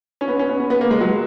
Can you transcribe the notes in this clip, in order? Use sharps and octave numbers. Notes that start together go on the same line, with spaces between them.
C#4
B3
C#4
B3
B3
B3
A#3
G#3
F#3